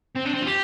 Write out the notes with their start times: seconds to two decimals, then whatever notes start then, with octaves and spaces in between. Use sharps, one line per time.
0.16 C4
0.26 D4
0.34 C4
0.42 F4
0.47 G4